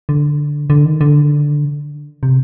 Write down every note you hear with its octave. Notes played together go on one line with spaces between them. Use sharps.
D3
D3
D#3
D3
C3